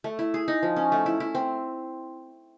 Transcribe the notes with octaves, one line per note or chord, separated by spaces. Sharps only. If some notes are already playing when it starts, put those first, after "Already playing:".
A3
E4
G#4
D#4
F3
C#4
A3
E4
E4
C4